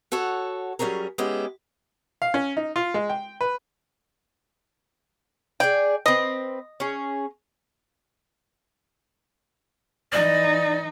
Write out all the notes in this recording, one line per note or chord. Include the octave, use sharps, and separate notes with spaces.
F#4 A4 C#5 F#5
F#3 G3 C#4 G#4 A#4
G#3 B3 C#4 E4 G4
F5
C#4
D#4
F4
G#3
G5
B4
G#4 C5 D5 G5
C4 B4 D#5
C#4 G#4
E3 D#4 D5